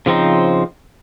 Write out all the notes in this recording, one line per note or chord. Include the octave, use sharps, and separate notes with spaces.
C#3 F3 C4 D#4